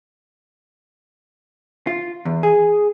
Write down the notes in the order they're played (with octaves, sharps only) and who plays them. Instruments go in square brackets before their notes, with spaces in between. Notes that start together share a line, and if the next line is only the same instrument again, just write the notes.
[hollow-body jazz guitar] F4
E2
G#4